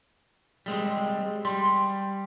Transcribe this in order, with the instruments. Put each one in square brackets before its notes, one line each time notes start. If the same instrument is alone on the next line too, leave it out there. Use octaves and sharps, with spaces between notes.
[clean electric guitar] G3 G#3 C4
[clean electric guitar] G3 [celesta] C6